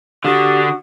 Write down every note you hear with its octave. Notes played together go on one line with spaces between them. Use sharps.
D3 D4 F#4 G4 D#6